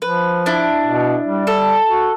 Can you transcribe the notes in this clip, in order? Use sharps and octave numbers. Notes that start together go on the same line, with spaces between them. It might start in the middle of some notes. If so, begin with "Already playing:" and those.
F3 B4
D4 E4
B2
G3
A4
F#4